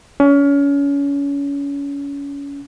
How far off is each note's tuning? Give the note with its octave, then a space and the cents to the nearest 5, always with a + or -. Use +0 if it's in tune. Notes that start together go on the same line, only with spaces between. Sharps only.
C#4 +30